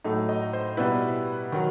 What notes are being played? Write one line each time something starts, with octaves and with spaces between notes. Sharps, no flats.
A2 F#3 A3 D#4
D#5
C5
B2 G3 B3 E4 B4
D#3 F#3